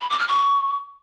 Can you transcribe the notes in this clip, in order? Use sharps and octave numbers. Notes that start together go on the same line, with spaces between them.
B5
D6
F6
C#6